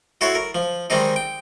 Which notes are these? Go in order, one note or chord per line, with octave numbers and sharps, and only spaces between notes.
E4 F#4 A4 C#5 F#5 C6
A#4
F3
D#3 G3 G#3 C4 D#4
G5